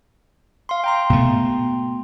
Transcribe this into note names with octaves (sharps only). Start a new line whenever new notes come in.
F5 C6
G5 A#5 C6
B2 A3